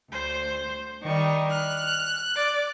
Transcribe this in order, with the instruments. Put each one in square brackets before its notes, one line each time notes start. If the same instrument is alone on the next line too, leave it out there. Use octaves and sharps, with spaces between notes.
[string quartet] D2 [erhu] C5
[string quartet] D#3 G3 D#4 [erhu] C#6
[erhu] F6 [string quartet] F#6
[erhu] D5